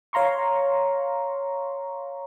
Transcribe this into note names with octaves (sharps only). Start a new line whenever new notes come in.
C#5 F5 A#5 C6 C#6